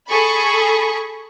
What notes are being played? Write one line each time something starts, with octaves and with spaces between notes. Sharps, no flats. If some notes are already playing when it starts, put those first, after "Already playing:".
G#4 A4 B5 C#6